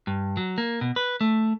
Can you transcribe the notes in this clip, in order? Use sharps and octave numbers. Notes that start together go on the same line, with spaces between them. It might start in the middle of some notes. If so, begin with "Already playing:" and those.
G2
F#3
A#3
B2
B4
A3